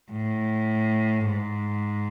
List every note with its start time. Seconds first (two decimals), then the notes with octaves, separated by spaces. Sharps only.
0.12 A2
1.26 G#2